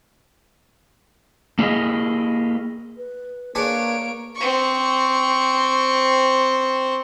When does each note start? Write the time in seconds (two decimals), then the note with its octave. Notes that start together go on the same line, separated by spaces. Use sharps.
1.59 A#3 E4 G4 G#4 A#4 D#5
2.98 B4
3.55 A#3 D4 G#4 B4 C#5 D7
4.36 C4 C#6